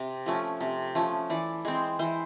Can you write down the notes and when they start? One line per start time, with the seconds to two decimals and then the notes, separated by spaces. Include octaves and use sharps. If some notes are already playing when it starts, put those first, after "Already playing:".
Already playing: C3
0.26 F3 A3 C#4
0.61 C3
0.95 F3 A3 C#4
1.30 E3 D5
1.65 G#3 C4
1.99 E3 C5